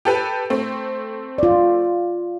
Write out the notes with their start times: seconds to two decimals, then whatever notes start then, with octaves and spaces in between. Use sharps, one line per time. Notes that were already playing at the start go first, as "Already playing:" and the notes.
0.05 G4 A4 B4
0.50 A3 C4
1.38 F4 D5